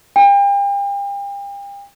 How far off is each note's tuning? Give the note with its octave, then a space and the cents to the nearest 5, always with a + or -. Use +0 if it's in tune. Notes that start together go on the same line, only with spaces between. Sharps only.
G5 +40